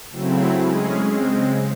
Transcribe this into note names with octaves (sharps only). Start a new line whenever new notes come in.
C#3 F#3 A3 C4 E4
G#3 C#4 G#4
C#3 G#3 C4